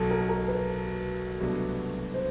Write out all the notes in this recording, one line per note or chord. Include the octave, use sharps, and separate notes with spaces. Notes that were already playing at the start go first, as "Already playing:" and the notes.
Already playing: B1 B2 F#3 A4
A#4
A#4
B4
C2 B2 F#3 A3 D4
C5